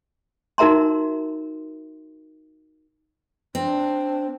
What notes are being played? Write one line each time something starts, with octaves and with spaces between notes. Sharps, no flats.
D#4 F#4 A#4 E5 A#5 C6
C4 D4